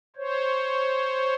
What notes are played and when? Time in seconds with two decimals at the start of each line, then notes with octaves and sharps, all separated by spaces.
0.16 C5 C#5